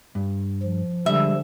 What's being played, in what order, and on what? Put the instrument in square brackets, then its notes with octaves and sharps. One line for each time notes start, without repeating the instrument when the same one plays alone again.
[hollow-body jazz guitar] G2
[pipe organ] F3
[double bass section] D3 G#3 [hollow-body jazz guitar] G3 [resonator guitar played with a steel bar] E5